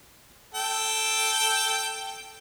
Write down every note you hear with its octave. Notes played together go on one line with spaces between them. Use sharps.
A4 G5